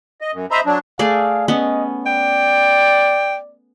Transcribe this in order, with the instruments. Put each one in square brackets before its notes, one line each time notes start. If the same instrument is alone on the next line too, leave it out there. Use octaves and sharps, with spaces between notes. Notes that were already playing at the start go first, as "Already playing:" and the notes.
[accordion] D#5
F#2
C5 D#5 E5 A#5 B5
F#3 D4
[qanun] A3 G#4 D5 [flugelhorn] F5
[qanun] B3 C#4 [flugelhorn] D#5
[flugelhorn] D5 [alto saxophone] G5